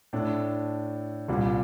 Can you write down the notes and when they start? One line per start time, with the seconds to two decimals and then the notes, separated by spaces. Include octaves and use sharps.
0.13 A2 A3 D4
1.28 C2 A#2 G3